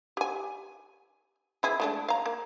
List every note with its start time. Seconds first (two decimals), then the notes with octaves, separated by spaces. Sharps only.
0.17 G4 G#5
1.63 E3 E4 G#4
1.80 G#3 A3 D4
2.08 F5 A#5
2.26 A#3